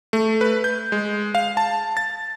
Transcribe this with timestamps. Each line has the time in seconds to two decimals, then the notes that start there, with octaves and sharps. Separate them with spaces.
0.13 A3
0.41 B4
0.64 G6
0.92 G#3
1.35 F5
1.57 A5
1.97 A6